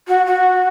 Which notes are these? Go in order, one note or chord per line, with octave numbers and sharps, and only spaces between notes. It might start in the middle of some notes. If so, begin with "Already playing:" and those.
F#4
F#4